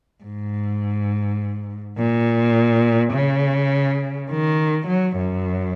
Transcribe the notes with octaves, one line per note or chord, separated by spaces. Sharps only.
G#2
A#2
C#3
D#3
F#3
F#2